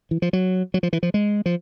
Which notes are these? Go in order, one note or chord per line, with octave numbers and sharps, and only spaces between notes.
E3
F3
F#3
F#3
F3
E3
F3
G#3
F3